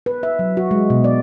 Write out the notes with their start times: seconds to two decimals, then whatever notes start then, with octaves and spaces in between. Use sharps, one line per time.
0.06 B4
0.23 E5
0.39 F#3
0.57 F#4
0.71 G#3
0.90 B2
1.04 D5